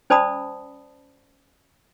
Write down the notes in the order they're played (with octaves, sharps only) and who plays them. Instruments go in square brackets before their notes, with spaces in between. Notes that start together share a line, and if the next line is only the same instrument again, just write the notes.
[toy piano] C#4 C5 D5 A5 B5 D#6